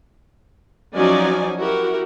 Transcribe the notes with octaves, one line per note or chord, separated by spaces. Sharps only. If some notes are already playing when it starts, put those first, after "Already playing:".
F3 F#3 C#4 D#4 D5 G#5
E4 F#4 G4 A#4